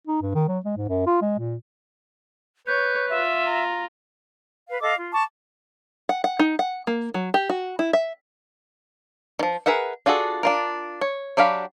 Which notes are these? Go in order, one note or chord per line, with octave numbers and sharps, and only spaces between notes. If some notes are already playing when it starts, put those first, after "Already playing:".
D#4
G2
D#3
F#3
G#3
G#2
F#2
F4
G#3
A#2
B4 C#5 G6
F4 E5
A#5
B4 F5
A4 D#5 F5 D6
F4
A5 C#6 D6
F#5
F#5
D#4
F#5
A#3
F#3
G4
F#4
E4
E5
D#3 F3
G#4 A#4 B4 E5 F#5
D4 F4 F#4 G#4 A4
D4 F4 A#4
C#5
F#3 D4 G4 F5 B5